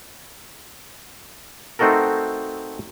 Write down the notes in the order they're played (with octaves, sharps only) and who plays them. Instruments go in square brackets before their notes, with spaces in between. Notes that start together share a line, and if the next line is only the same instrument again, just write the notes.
[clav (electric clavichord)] A3 C4 D#4 F#4 A4 A#4